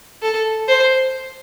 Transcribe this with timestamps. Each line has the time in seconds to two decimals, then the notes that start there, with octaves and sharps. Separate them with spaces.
0.22 A4
0.68 C5